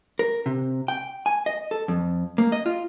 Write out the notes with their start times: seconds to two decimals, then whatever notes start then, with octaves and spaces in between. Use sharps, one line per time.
0.19 A#4
0.46 C3
0.88 G5
1.26 G#5
1.46 D#5
1.71 A4
1.88 F2
2.38 A#3
2.52 D#5
2.66 F4